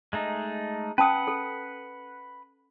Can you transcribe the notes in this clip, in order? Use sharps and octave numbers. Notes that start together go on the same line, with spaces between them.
G#3 A3 D#4
C#4 B4 F#5 A5 D#6
A4